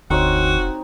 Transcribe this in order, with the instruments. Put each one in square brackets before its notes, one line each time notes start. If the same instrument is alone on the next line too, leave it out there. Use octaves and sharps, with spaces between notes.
[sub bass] F1 [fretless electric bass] D2 [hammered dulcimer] C4 D#4 C#5 [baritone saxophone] F#4